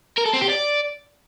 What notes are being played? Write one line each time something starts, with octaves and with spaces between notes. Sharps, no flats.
A#4
A4
C4
G4
D5